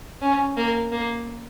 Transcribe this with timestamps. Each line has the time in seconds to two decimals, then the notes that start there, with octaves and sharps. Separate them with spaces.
0.22 C#4
0.57 A#3
0.92 A#3